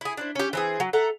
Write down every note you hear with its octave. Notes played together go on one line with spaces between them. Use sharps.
E4 G#4
D4 E4 C5
C#4 G4
E3 C4 G#4
F#3
A4 E5 F#5 A#5